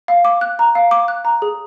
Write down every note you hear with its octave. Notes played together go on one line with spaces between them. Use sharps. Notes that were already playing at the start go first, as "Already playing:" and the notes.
F5
D6
F#6
A#5
F5
D6
F#6
A#5
G#4